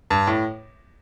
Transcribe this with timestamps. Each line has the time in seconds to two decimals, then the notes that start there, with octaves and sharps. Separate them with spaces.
0.10 G2
0.27 A2